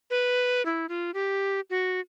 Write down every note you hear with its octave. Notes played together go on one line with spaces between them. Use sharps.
B4
E4
F4
G4
F#4